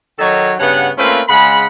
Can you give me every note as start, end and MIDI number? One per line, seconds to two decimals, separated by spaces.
0.19 0.53 51
0.19 0.53 54
0.19 0.53 63
0.19 0.53 69
0.19 0.53 73
0.59 0.90 43
0.59 0.90 49
0.59 0.90 59
0.59 0.90 73
0.59 0.90 78
0.98 1.21 57
0.98 1.21 58
0.98 1.21 60
0.98 1.21 61
0.98 1.21 65
0.98 1.21 71
1.29 1.66 49
1.29 1.66 56
1.29 1.66 78
1.29 1.66 83